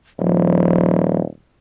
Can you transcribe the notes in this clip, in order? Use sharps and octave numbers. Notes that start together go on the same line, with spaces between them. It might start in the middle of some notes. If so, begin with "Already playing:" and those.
D#1 F3